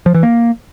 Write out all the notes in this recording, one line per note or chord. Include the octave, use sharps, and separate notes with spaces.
F3
E3
A#3